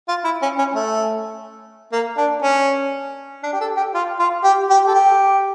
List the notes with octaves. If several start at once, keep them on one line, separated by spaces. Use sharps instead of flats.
F4
E4
C#4
C#4
A3
A#3
D4
C#4
D4
G4
A4
G4
F4
F4
G4
G4
A4
G4